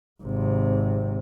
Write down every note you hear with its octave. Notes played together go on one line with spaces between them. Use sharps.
G#1 C3